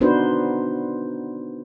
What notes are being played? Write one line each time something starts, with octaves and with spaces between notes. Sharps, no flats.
B3 D4 D#4 F#4 B4 C5